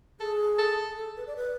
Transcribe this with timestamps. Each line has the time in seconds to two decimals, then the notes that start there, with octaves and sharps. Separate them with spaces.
0.20 G#4 A4
0.59 A4
0.98 A4
1.17 B4
1.27 D5
1.37 B4